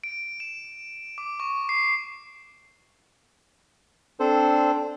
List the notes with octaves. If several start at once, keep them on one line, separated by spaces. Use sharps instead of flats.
D7
E7
D6
C#6
C7
C4 D4 A4 C5